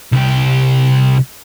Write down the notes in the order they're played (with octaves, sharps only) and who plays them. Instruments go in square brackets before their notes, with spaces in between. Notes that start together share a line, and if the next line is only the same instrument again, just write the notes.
[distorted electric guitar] C2 G4